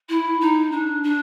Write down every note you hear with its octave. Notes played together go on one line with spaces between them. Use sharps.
E4
D#4
D4
D4